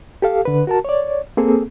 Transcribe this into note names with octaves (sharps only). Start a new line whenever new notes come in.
G4 A4 F5
D3 B4
F#4 A#4 A5
C#5 D5
A#3 C4 G#4 A4